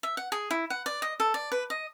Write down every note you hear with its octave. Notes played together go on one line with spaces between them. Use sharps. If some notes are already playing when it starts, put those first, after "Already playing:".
E5
F#5
G#4
E4
F#5
D5
D#5
A4
D5
B4
D#5